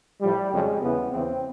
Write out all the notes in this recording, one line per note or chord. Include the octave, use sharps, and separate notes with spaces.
A2 F3 G3
F2 C#3 F#3 G#3
E2 C#3 E3 B3
E2 C#3 E3 C4